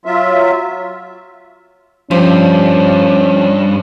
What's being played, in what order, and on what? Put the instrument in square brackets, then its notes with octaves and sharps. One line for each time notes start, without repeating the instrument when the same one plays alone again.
[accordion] F#3 F4 E5
[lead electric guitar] G2 [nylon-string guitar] F3 [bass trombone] C#4